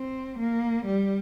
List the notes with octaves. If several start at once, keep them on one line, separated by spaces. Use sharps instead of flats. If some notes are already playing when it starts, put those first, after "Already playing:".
Already playing: C4
A#3
G3